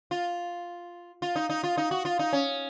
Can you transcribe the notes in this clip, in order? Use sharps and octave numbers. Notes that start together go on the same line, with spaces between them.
F4
F4
D#4
D#4
F4
D#4
F#4
F4
D#4
C#4